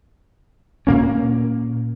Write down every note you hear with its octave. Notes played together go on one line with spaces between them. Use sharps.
A#2 A#3 C#4